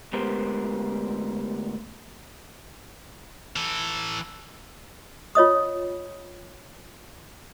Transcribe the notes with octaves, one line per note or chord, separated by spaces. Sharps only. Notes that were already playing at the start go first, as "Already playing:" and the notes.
D2 G#3 B3 G4 A#4 C5
E3 A4
F4 C#5 D#5 D#6